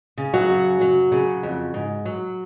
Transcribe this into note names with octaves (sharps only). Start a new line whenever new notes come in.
C#3
F#3 F#4
F#2
F#3
C#3
F2
G#2
F#3